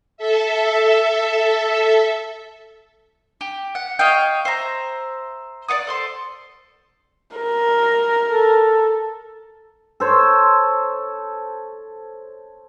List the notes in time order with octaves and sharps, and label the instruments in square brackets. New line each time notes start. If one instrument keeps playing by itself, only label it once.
[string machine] A4 E5
[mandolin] G4
F#5
C#5 D#5 F5 G5
C5 E5 A#5
D5 F5 F#5 D#6
A4 C5 C6
[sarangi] A#4
[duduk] A4
[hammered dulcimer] A4 C5 C#5